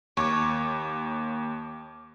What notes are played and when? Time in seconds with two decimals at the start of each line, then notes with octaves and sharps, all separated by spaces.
0.17 D#2 C#5 D6